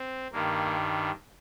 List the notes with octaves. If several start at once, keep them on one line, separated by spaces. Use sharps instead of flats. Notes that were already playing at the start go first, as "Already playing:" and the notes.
Already playing: C4
G2 D#3 G3 A#3